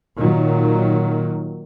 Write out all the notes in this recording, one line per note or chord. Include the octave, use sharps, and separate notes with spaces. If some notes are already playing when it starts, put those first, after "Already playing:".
A#2 D#3 F#3